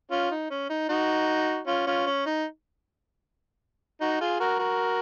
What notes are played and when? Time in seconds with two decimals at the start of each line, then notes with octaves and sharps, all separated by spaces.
0.11 C#4 F4
0.31 D#4
0.51 C#4
0.70 D#4
0.89 D#4 F#4
1.67 C#4 F4
1.87 C#4 F4
2.07 C#4
2.26 D#4
4.01 D#4 F#4
4.21 F4 G#4
4.40 F#4 A#4
4.59 F#4 A#4